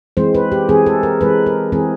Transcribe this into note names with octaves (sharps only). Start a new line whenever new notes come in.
E3 G#3 C4 C5
B4
G4
E3 G#3 C4 G#4
A4
A#4
E3 G#3 C4 B4
A#4
E3 G#3 C4 G#4